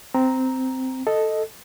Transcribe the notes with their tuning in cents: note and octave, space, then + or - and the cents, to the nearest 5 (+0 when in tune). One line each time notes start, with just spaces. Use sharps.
C4 -10 A#5 +0
A4 +0 D#5 +0